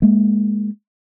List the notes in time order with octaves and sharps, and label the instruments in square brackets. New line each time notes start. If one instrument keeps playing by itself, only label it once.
[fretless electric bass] G#3 A#3